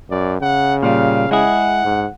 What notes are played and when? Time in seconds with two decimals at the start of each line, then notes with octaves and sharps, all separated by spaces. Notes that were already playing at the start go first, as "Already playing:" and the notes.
0.11 F#2 D5
0.41 C#3 F#5
0.83 A#2 G3 F5
1.31 G#3 E4 G#4 F#5
1.84 G#2